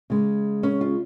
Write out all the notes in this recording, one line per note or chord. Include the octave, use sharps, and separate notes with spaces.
C#3 G#3
C#4
F4